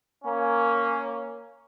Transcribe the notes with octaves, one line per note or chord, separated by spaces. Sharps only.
A#3 C#4